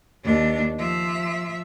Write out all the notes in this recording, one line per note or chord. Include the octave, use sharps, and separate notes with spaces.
D#2 D4
F3 E5